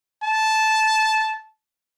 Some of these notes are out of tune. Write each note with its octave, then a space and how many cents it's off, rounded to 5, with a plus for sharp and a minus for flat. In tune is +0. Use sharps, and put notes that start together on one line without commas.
A5 -10